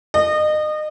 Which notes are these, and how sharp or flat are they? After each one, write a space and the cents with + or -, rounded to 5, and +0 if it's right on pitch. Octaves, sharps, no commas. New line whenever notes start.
D#5 -30